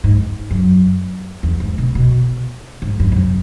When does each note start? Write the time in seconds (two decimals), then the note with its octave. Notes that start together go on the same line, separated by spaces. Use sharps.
0.04 G#2
0.51 F#2
1.43 E2
1.60 G#2
1.78 B2
1.95 B2
2.82 G#2
3.00 F#2
3.12 G#2
3.16 F#2